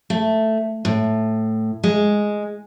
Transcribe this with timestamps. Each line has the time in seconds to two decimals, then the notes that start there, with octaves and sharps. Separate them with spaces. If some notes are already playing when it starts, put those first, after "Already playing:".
0.10 A3
0.85 A2
1.84 G#3